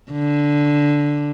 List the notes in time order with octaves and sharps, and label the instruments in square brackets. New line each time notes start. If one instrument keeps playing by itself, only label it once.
[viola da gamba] D3